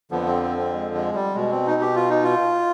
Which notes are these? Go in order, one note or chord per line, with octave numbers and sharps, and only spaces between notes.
F2 D3 F3 B3
C4
C4
C4
G#3
G#3
G3
B2 G#3
C4
D#4
G4
F4
D#4
F4